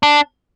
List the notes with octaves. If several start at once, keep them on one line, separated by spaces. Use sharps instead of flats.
D4